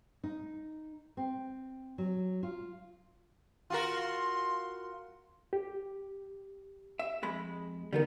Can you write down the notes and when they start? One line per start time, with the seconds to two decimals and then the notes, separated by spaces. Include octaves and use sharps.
0.24 D#4
1.17 C4
1.98 F#3
2.43 F4
3.70 F4 F#4 A#4 C6
5.53 G4
6.99 E5
7.22 F2 G#3 B5
7.93 D3 E3 G3 B3 D#4 A#4